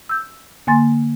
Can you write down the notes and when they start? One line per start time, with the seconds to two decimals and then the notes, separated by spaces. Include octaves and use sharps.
0.09 E6 G6
0.67 D3 A#3 G#5 C6 A6